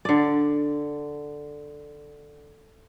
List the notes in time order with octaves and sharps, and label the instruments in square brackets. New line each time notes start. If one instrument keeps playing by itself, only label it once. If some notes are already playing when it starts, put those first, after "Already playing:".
[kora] D3 D5